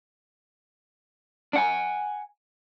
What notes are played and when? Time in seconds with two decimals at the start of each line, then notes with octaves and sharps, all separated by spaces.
1.53 D4 F#5 G#5